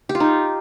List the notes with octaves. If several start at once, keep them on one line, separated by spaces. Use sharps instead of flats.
G4
F4
D#4